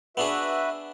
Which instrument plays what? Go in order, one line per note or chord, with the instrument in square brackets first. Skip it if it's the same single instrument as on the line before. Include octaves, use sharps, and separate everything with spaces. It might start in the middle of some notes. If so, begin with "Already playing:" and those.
[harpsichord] B3 D4 G#4 [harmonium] F#4 B4 E5